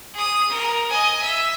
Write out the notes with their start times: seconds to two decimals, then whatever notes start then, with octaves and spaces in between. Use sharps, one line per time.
0.14 G#4 D#6
0.49 A#4
0.90 D#5 G#5
1.22 E5